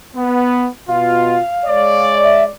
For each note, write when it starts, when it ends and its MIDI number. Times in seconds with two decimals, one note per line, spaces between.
0.14 0.67 59
0.88 1.38 47
0.88 1.38 65
0.88 2.14 77
1.65 2.51 56
1.65 2.51 73
1.65 2.51 74
2.23 2.43 76